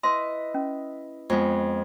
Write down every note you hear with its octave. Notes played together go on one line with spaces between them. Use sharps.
E4 B4 D#5 C6
C#4
F2 G#3 B3